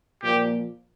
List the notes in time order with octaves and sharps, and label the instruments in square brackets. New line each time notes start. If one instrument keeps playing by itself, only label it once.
[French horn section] A#2 F3 A#3 [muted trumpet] G4